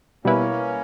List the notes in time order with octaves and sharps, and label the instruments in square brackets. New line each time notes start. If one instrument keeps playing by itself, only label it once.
[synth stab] B2 G3 B3 E4 B4 [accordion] A#3 C#4